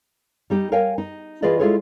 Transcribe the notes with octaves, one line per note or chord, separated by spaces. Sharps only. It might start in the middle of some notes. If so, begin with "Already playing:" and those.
G3 D#4 G4
A#4 C#5 F5 G5 G#5
D#4
E3 F4 G#4 B4 D5 D#5
G#3 E4 F4 G#4 A4 C#5